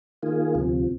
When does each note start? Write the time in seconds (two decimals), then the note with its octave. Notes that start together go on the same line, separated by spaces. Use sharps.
0.23 D#3 A#3 F4 G#4
0.55 D2 C3 F3